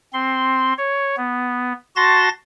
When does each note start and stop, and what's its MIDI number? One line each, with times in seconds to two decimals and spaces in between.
0.13 0.73 60
0.13 0.73 84
0.78 1.16 73
1.17 1.73 59
1.96 2.29 66
1.96 2.29 81
1.96 2.29 84
1.96 2.29 93
1.96 2.29 94